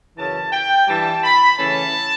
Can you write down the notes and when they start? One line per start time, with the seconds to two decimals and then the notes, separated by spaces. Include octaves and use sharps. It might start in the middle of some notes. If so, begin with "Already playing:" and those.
0.17 F#2 C#3 E3 A5
0.53 G5
0.88 G2 E3 G3 A5
1.24 B5
1.59 C#3 E3 A3 C#4 A5